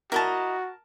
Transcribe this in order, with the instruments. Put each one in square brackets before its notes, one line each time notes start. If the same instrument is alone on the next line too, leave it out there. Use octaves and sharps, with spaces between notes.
[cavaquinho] E4 D#5 A#5 [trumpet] F#4 [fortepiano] A#4 A5